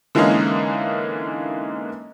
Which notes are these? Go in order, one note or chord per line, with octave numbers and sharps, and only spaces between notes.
D3 E3 G#3 A#3 C#4 D#4